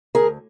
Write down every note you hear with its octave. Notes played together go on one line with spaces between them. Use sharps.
D2 G#4 A#4